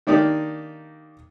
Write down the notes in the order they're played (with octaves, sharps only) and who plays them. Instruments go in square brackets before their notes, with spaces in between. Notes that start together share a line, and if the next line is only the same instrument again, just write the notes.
[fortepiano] D#3 A#3 D4 D#4 G4